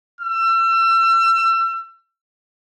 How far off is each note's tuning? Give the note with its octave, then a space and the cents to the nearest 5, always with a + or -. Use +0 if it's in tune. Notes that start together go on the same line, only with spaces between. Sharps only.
E6 +35